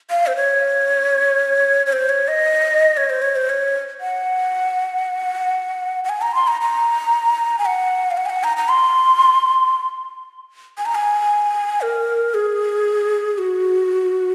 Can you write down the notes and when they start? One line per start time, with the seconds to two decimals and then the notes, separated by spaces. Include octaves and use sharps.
0.10 F5
0.27 C5
0.36 C#5
1.86 C#5
1.92 C5
2.09 C#5
2.28 D#5
2.97 C#5
3.10 C5
3.22 C#5
3.36 C5
3.49 C#5
4.00 F#5
6.04 F#5
6.09 G#5
6.21 A#5
6.35 C6
6.47 A#5
6.61 A#5
7.58 G#5
7.65 F#5
8.11 F5
8.17 F#5
8.26 G#5
8.30 F#5
8.44 A#5
8.57 A#5
8.69 C6
10.78 G#5
10.86 A#5
10.95 G#5
11.81 A#4
12.34 G#4
13.38 F#4